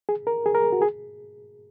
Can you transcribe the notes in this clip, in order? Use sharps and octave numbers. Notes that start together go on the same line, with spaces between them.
G#4
A#4
G#4
A#4
F#4
G#4